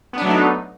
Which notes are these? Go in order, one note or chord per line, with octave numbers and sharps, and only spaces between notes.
F#3 A3 B3 D4 D#4